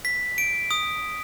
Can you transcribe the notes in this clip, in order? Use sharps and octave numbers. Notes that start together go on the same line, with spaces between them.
B6
D7
D#6